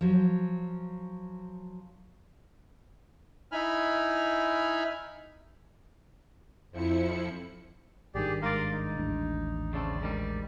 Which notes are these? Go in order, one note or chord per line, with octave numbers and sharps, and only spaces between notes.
F3 F#3
D#4 E4 G#5 B5 F6
F2 F3 E4 C#7
G#1 G2 D#3 G4 G#4 D5
G#3 A#4 D5 F5 C6
D#4
D#1 A1 D4
C#3 A3 C4 D5
G#2 D#3 G3